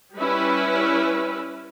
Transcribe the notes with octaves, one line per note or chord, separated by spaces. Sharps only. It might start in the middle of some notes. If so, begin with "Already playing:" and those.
G3 C#4 E4 B4